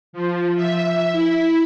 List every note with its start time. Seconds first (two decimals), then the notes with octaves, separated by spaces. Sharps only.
0.13 F3
0.56 E5
1.12 E4